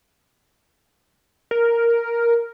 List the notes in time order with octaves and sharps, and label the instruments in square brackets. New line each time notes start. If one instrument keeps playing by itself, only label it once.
[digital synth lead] A#4